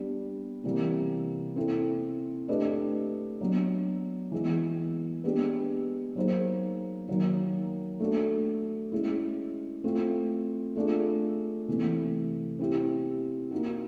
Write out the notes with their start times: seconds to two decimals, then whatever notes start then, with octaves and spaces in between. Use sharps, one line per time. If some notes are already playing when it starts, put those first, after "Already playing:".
Already playing: G3 B3 D4
0.64 C3 E3 G3 A#3
1.56 C4 E4 A4
2.48 A3 D4 G4 B4 D#5
3.41 F#3 B3 D4
4.32 E3 G#3 B3
5.24 G#3 B3 D4 G4 B4
6.15 F#3 A#3 D#4 G#4 C5
7.08 D#3 F#3 A#3
8.00 A3 D4 F#4 A4
8.92 G#3 C#4 E4
9.84 A3 C4 F4
10.76 A3 D4 F4 G#4
11.68 C3 E3 A3
12.59 C4 E4 G4
13.51 A#3 D#4 F#4